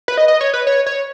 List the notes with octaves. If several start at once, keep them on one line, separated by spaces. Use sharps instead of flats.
B4
D#5
D#5
C#5
B4
C#5
C#5